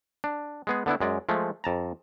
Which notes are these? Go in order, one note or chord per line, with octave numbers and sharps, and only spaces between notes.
D4
G#3 B3 G#4
D3 B3 D4 E4
F#2 G#3 D5
F3 G#3 A3
F2 A5 A#5